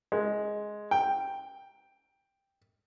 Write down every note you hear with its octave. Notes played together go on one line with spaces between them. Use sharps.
G#3
G5